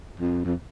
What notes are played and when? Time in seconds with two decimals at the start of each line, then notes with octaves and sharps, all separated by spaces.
0.20 F2
0.45 F2